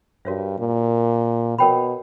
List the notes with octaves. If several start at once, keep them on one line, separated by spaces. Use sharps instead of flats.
G2 F#4 A#4 C#5 E5
A#2
B2 A#4 C#5 G5 B5